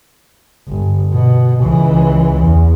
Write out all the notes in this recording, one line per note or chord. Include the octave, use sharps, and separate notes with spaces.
G1
B2
C#2 E3
E2